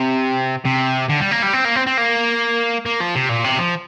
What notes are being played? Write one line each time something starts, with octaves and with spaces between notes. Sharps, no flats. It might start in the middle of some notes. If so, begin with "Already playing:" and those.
Already playing: C3
C3
D3
G3
A#3
G3
C4
A#3
C4
C4
A#3
A#3
F3
C3
A#2
C3
F3